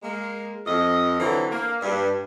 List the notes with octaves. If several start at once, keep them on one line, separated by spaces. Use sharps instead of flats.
G#3 A#3
F2 D#5
D3 E3 F#3 C4
A#3
G2